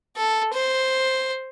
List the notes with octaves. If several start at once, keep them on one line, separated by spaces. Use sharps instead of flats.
A4
C5